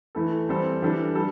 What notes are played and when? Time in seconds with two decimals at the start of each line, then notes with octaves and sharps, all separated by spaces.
0.15 E3 A3 E4 A4
0.49 E3 G3 C4 A4
0.82 E3 G3 D4 A4
1.15 G3 A4